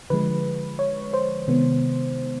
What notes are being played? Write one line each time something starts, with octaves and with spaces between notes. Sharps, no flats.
D3 F3 G#3 B4
C#5
C5
C3 D#3 G#3 B3